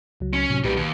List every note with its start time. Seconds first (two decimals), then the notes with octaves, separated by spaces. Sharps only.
0.20 C#2 F#3
0.33 C#4
0.50 A2 C3 F#3
0.64 B1 A#2 G3 G4 B4
0.77 D#2